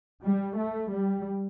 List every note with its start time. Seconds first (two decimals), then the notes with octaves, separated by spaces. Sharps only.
0.23 G3
0.57 A3
0.91 G3